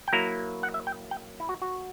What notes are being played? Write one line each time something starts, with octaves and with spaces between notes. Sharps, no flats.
G5
F#3 A#3 E4 A#5
F#5
E5
G5
G5
E4
F#4
F#4